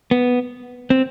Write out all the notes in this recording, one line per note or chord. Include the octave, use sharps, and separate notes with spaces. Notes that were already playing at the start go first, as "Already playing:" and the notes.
B3
C4